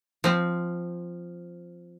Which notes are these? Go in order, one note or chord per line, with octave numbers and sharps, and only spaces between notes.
F3 C4